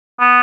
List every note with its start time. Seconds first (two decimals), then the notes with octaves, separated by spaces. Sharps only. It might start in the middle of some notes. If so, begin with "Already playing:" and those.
0.20 B3